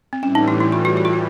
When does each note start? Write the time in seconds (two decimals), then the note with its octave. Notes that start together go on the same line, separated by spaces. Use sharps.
0.13 C4
0.22 A2 E3 G3 C#4
0.35 D#4
0.48 E4
0.60 E4
0.72 F4
0.85 F#4
0.97 F#4
1.05 F4
1.13 F#4